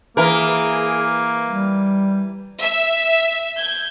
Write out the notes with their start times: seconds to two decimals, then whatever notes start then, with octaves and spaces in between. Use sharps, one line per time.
0.17 E3 A#3 G#4 A#4
1.46 G3
2.60 E5
3.57 G6 G#6